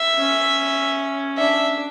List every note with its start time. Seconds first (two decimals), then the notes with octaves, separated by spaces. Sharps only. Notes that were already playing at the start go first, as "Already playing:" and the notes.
Already playing: E5
0.19 C#4
1.37 D4 E5